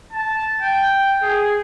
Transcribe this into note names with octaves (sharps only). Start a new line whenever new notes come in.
A5
G5
G#4